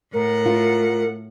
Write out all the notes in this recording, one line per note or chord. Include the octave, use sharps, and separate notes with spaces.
A2 A#4 F#5
F4